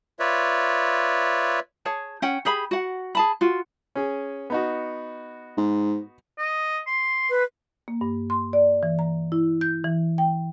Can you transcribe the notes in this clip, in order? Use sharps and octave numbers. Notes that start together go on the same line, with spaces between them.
F4 B4 C#5 D5 E5
G#4 C#5 A5
C#4 F#5 G5
G4 G#4 B5
F#4 F#5
G#4 A5 B5
F4 F#4
C#4 G#4
B3 D#4 F#4
G#2
D#5
C6
B4
A#3
G2
C6
D5
E3
A#5
E4
G6
E3
G5